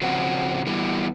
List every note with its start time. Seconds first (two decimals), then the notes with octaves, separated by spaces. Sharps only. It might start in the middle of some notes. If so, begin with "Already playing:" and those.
0.01 C#3 F3 C4 C#4 F#4
0.66 E3 G3 B3